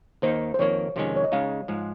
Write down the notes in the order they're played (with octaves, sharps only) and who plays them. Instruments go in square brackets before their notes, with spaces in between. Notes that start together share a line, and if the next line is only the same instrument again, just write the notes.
[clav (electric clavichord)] D#2 D#3 A#3 D#4 [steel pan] C5
[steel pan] C5
[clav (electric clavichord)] F2 D#3 A#3 [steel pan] C#5
[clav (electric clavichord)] F2 C3 D#3 G#3 C#4
[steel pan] C#5
D#5
[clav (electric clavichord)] C#3 G#3 D#4 [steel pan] F5
[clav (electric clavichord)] G#2 F3 G#3